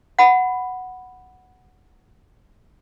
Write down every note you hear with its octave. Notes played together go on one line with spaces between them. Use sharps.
F#5 B5